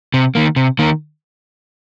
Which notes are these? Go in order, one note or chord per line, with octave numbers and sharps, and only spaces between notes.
C3
D#3 A#3
C3
D#3 A#3